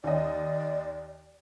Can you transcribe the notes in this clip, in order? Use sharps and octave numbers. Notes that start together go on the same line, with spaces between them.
D#2 D5 D#5